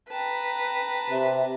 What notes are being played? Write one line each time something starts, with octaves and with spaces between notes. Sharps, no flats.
B4 G5 A5 A#5
C3 E5